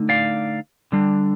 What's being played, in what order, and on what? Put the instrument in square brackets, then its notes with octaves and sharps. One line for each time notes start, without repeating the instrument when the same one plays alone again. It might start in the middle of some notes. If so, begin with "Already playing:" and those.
Already playing: [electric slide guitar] D3 A3 D#4
D5 F5
D3 G3 D4